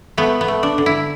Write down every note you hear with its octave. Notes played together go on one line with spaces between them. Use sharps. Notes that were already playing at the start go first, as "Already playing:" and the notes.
A3 B3
B3
A3
D4
D3
E4